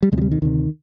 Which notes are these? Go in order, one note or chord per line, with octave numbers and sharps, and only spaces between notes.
G3
D2 C3 G#3
F3
G3
D#3
D2 C3 D#3